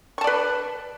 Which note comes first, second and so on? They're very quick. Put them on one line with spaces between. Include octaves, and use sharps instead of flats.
C#6 A5 D5 B4